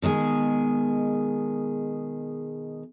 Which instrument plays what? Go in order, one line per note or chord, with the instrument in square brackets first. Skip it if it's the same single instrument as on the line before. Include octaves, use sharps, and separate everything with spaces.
[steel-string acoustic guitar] B2 D#3 G#3 G#4